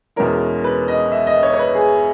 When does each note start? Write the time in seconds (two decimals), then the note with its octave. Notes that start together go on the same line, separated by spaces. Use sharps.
0.16 E2 B2 G#3 C#4 E4 A#4
0.64 B4
0.88 D#5
1.12 E5
1.27 D#5
1.43 C#5
1.54 C#5
1.59 B4
1.75 G#4